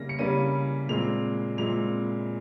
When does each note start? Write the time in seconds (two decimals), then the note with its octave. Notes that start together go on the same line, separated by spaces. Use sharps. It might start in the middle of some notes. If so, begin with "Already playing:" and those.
Already playing: C#3 G3 A#3 C#4 A#6
0.09 C#7
0.19 C#3 G3 A#3 C#4 D#7
0.89 A#2 G#3 C4 F7
1.58 A#2 G#3 C4 F7